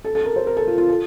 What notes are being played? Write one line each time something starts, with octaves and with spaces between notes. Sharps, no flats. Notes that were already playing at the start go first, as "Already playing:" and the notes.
A4
A4
A#4
C5
A#4
A4
F4
F4
A4